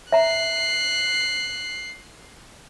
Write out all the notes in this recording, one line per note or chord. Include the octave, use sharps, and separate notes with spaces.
E5 A#5 F#6 C7